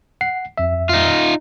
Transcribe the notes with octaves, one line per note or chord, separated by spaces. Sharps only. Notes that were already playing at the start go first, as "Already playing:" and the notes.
F#5 C7
F2 E5
D#4 F4